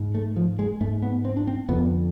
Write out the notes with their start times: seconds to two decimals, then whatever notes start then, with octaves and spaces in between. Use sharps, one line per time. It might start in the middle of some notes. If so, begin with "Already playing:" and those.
Already playing: G#2
0.15 A3
0.36 F3
0.59 G#3
0.81 G#2 A3
1.02 B3
1.25 C4
1.37 D4
1.47 C4
1.69 F2 D3 B3